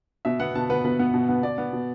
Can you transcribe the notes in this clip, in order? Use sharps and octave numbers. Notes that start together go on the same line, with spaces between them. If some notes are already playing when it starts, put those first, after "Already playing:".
B2 E5
B3 F#5
B2 A5
B3 B4
B2 B4
B3
B2
B3
B2 D5
B3
B2